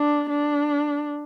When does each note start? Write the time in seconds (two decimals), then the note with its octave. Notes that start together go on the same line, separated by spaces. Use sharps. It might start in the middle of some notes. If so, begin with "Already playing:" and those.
Already playing: D4
0.29 D4